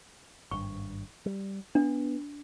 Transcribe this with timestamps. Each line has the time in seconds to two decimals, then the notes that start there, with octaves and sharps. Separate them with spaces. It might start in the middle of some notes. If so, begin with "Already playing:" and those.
0.51 G#1 G2 C#6
1.26 G3
1.75 B3 D4